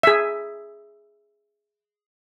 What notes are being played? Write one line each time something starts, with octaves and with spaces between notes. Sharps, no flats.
G#4 E5